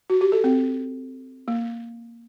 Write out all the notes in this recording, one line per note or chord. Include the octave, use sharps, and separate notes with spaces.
F#4
G4
A4
C4
A#3